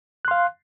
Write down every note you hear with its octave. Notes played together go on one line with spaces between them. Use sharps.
F5 C6 F#6